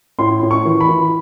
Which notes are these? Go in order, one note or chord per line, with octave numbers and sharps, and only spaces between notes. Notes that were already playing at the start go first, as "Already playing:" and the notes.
A2 C6
A2
C#6
E3
B5
E3